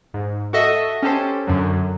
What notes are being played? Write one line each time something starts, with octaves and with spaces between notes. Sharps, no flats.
G#2
F#4 A4 D#5 E5
C#4 G4 A4 C5
F#2 D3 F#3